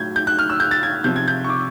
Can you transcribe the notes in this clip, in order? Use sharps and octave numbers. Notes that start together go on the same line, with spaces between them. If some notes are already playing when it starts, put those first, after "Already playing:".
Already playing: A2 F#3 G6 G#6
G6
F#6
F6
E6
G6
A6
G#6
C3 F3 G6
G#6
G6
C#6
D6